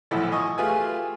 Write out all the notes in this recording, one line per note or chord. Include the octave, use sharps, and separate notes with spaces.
B1 A2 E3 F3 A4
D#5 G#5 C#6 D#6
A3 F4 G4 G#4 B4 G#5